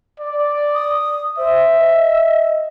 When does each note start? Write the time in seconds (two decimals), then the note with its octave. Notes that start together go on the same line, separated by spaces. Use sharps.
0.20 D5
0.74 D#6
1.38 C5 E5
1.79 D#5